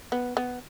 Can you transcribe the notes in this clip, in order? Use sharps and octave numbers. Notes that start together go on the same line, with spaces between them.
B3
B3